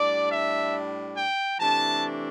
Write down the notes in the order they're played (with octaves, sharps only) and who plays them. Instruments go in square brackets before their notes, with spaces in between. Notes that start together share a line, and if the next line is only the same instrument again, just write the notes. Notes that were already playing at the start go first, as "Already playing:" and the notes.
Already playing: [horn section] A2 G3 D4 D5
E5
G5
C3 E3 A3 D4 A5